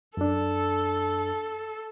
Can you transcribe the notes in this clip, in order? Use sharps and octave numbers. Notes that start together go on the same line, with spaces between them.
F#2 D4 A4